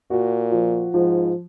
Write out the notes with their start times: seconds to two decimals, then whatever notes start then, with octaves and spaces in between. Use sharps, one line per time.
0.11 A#2 F#4
0.52 F3
0.94 G#2 F3